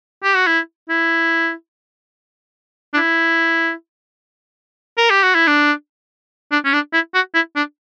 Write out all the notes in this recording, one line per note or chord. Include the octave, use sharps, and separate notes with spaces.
G4
F#4
E4
E4
D4
E4
A#4
G4
F#4
E4
D4
D4
C#4
D4
E4
F#4
E4
D4